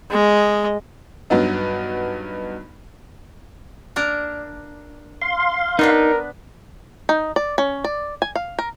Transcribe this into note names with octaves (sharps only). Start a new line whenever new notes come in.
G#3 D#5
G2 F#3 B3 D#4
A#3 D4 A#4
F5 C6
B3 D4 D#4 A#4 B4
D#4
D5
C#4
D5
G#5
F5
A#4